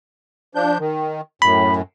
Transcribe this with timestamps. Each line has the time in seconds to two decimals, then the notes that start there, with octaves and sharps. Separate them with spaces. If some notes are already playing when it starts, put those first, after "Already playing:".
0.55 F3 D4 G6
0.80 D#3
1.42 F#2 A2 B5